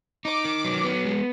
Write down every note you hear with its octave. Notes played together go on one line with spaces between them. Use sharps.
D#4 D6
D#3
F#3
B3
G#3